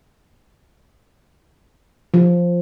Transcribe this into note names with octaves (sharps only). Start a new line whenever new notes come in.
F3